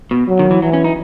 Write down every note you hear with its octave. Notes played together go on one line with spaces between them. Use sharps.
B2
F#3
D#3
E3
E3 F#3
C#4
D#4